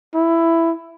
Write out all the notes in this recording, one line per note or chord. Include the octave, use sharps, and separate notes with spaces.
E4